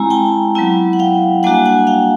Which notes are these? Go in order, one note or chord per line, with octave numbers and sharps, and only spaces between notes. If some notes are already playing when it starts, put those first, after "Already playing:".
Already playing: G#3 C4 E4 G#5 A#5
G5 A5
F#3 B3 E4
F#5
F5 G5
G3 A#3 D4 F#4 F#5 G#5
F#5 G#5
F5 G5